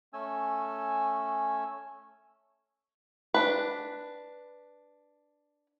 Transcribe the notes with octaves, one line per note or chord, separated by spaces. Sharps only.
A3 C#4 G#5 E6
D4 B4